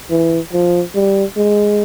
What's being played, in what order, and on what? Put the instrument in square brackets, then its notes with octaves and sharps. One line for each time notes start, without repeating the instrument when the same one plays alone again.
[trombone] E3
F3
G3
G#3